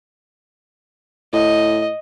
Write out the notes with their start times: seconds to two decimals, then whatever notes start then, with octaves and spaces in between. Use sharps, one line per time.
1.33 A2 D#5